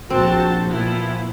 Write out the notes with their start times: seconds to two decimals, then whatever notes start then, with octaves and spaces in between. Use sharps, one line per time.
0.10 A#1 C4 F#4 C5 A5
0.69 A#2 F3 B3 E4